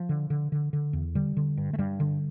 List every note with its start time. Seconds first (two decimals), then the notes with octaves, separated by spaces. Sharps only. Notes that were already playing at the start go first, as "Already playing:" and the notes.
Already playing: F3
0.09 D3
0.30 D3
0.52 D3
0.73 D3
0.93 E2
1.15 D3 G3
1.37 D3
1.58 G2
1.73 A3
1.79 G2 G3
2.00 D3